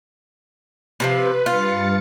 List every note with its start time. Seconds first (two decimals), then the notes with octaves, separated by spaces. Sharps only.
1.00 C3 D#3 F3 B4
1.46 G2 F4 A6 C#7